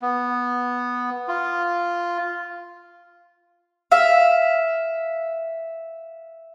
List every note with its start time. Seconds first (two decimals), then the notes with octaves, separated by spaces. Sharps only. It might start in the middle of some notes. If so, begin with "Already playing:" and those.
0.02 B3
1.28 F4
3.91 E5 F5